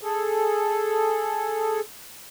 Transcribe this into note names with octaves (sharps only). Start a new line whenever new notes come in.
G#4 A4